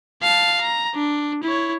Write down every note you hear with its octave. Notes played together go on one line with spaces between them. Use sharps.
F5 A5
A#5
D4
E4 C#5